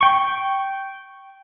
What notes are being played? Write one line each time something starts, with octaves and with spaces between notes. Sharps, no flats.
G5 C#6